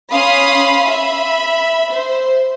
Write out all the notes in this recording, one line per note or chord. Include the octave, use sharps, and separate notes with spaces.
C#4 F5 B5 C6 D#6
E5 B5
C5